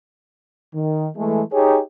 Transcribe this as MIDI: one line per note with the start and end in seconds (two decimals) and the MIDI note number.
0.74 1.09 51
1.17 1.41 52
1.17 1.41 56
1.17 1.41 57
1.53 1.79 63
1.53 1.79 67
1.53 1.79 68
1.53 1.79 73